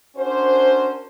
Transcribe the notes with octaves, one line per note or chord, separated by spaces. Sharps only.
C#4 D4 F#4 A#4 C5